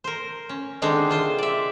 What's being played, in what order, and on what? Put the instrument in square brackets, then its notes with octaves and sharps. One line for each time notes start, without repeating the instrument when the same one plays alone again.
[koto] A#4 C5
C#4
D3 D#3 G#3 C4 D4 C5
C3 F4 C5
D5 E5